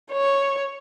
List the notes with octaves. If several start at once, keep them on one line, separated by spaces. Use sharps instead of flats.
C#5